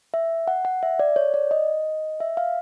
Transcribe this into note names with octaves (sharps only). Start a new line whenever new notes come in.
E5
F#5
F#5
E5
D5
C#5
D5
D#5
E5
F5